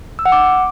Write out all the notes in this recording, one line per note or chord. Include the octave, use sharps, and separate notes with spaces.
E6
F#5
D6